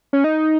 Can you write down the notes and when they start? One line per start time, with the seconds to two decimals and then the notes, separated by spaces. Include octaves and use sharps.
0.13 C#4
0.24 D#4